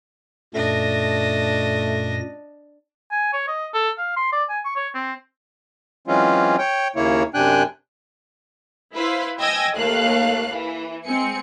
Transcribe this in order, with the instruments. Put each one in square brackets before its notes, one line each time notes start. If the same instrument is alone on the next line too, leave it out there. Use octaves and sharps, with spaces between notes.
[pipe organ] F#2 A#2 A#6 [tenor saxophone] A3 [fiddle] D4 D#5
[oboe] G#5
C#5
D#5
A4
F5
C6
D5
G#5
C#6
C#5
C4
[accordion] E3 F#3 G#3 C4 C#4 F4
C#5 G5
D#2 C#3 A#3 E4 C#5
F#2 C3 D4 G5 G#5 F#6
[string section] E4 B4 C5 F5
D#5 G5 G#5 E6 G#6 A#6
D#2 A3 A#3 A4 F5 F#6
E3
G#3 C4 G#5 C#7